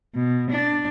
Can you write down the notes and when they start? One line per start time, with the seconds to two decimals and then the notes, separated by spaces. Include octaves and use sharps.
0.15 B2
0.51 D4